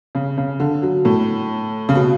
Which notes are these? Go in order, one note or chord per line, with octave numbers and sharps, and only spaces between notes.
C#3
C#3
D3
F#3
A2
C#3
B2